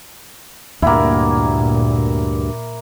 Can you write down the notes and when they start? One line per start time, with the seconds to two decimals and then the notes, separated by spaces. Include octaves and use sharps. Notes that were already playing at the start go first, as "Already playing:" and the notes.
0.82 D2 G2 A#2 A#3 E4